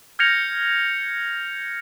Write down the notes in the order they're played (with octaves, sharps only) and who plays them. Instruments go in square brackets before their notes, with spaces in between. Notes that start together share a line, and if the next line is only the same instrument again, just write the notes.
[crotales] F6 G6 G#6 A#6 C#7 F7